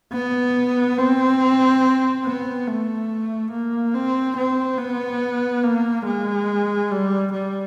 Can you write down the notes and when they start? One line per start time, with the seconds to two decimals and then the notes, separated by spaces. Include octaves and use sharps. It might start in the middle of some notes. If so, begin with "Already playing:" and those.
0.13 B3
0.98 C4
2.25 B3
2.67 A3
3.52 A#3
3.94 C4
4.38 C4
4.79 B3
5.63 A#3
6.06 G#3
6.91 G3
7.33 G3